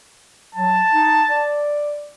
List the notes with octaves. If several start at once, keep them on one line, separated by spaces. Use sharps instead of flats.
F#3 A5
D#4
D5